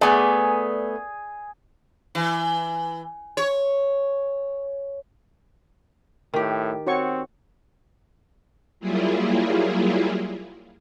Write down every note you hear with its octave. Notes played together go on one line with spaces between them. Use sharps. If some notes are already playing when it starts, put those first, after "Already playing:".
A3 B3 G#4 D5 G#5
E3
C#5
A2 D#3 G4
C4 F#4 C#5 C#6
F#3 G3 A#3 E4 F4 G#4